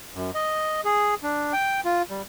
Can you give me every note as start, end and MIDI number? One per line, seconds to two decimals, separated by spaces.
0.15 0.31 42
0.35 0.81 75
0.85 1.15 68
1.23 1.53 62
1.53 1.81 79
1.85 2.02 65
2.10 2.22 55